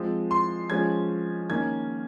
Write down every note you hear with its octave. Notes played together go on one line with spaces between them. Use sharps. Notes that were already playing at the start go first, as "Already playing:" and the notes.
Already playing: F3 G#3 C4
C6
F3 G#3 C#4 G#6
D#3 A#3 C#4 G#6